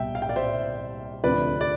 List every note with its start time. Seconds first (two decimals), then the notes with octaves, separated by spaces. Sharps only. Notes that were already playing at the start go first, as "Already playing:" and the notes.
Already playing: C2 B2 G3 E5 G5
0.15 F5
0.22 G5
0.29 D5 F5
0.36 C5 E5
1.24 D2 C3 F3 A3 B4 D5
1.61 D5